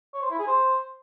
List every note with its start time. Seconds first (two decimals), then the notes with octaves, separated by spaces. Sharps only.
0.14 C#5
0.22 C5
0.31 E4
0.39 G#4
0.47 C5